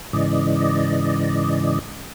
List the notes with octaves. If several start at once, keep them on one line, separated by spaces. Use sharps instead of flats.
G#2 C#3 E3 D5 D#5